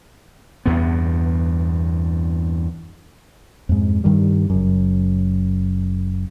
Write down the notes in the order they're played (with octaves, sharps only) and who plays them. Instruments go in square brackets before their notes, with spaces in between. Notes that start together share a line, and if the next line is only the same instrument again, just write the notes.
[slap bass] E2 G2 B3
[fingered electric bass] F2 G#2
G2 D#3 G3
F#1 F#2